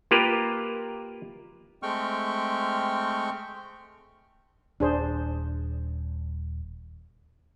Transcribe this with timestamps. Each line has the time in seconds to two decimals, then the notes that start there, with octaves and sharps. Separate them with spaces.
0.11 A#3 F4 G4 A#4 B4
1.83 G#3 A3 C4 G5 C#6 F6
4.80 D#1 D4 G#4 C5